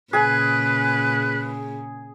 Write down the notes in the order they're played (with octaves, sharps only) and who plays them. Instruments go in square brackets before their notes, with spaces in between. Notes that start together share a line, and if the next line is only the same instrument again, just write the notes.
[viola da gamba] A#2 C#3 [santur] G#4 G#5 [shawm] B4